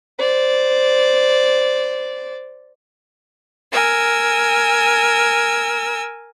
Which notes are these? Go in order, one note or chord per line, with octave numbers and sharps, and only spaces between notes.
C5 D5
A#4 G#5 E6